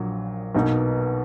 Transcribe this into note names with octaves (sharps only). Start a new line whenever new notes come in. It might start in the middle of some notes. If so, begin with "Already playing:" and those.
Already playing: A#1 A#2 F#3
B1 B2 A#3 D#4